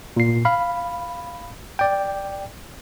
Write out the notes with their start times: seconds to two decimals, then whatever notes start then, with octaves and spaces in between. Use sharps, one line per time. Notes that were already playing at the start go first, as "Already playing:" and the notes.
0.16 A#2 C7
0.45 F5 B5
1.79 D5 G5